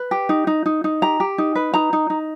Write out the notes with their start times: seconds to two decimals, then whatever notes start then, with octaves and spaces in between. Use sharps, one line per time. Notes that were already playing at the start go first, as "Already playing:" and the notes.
Already playing: B4
0.11 G4
0.29 D#4
0.47 D#4
0.66 D#4
0.84 D#4
1.02 G4 A#5
1.20 G4
1.38 D#4
1.55 B4
1.74 D#4 A#5
1.93 D#4
2.10 D#4